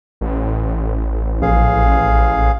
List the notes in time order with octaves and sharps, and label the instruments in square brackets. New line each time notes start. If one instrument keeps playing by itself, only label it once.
[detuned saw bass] A1
[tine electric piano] A#1 [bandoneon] G#4 F5